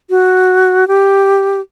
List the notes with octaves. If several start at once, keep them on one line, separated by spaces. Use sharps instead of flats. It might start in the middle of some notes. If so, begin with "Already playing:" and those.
F#4
G4